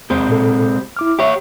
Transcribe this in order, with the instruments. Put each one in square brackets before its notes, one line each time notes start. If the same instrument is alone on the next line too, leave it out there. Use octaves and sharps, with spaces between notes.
[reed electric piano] E2 [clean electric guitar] C3 G#3 C4
[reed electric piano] A#2 A4
E4 D6 F6
[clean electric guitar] G4 C#5 [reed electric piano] E5